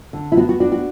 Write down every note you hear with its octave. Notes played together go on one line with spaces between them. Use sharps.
D3
E4
B3 F#4
F#4
D4 F#4
F#4